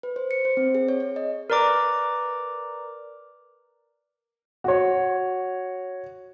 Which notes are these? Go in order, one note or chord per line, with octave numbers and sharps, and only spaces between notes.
B4
C5
C#7
C5
C4
G#4
C#5
C#5
D#5
A#4 B4 D5 A#5 D6
F#4 C#5